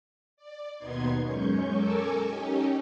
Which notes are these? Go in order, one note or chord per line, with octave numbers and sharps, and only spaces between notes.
D5
D#2 B2 B3 D#4 C6 G#6
F#2 G#3 C#4 C#6 G6
A4 A#4 G#5 C#6 D6 E6
C#4 D#4 G4